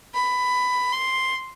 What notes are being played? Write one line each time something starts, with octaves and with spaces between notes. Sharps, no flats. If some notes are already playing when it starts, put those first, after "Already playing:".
B5
C6